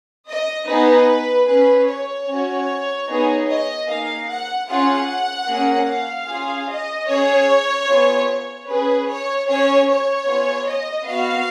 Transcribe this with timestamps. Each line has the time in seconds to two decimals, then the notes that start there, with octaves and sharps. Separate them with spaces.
0.28 D#5
0.68 B3 D#4 G#4 B4
1.48 C#4 G#4 B4
1.88 C#5
2.28 C#4 F#4
3.07 B3 D#4 G#4
3.47 D#5
3.87 A#3 D#4 G#4 F5
4.28 F#5
4.67 C#4 F4 G#4 F#5
5.47 A#3 C#4 G#4
5.87 F5
6.27 C#4 F4 G#4
6.67 D#5
7.07 C#4 G#4 C#5
7.87 B3 F4 G#4
8.27 C#5
8.66 C#4 G#4 B4
9.06 C#5
9.46 C#4 G#4 C#5
9.87 C#5
10.26 B3 F4 G#4
10.67 D#5
11.06 B3 F#4 F5